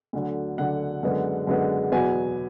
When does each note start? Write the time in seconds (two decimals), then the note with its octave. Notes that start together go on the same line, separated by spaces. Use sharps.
0.13 D2 D3 F#3
0.58 D2 D3 F#3 F#5
1.03 F#2 D3 G#3 B3
1.47 F#2 D3 G#3 B3
1.92 E2 B2 F#3 B3 G#5